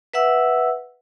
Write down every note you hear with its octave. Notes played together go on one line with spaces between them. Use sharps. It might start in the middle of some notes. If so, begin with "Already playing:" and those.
B4 E5 F#5 E6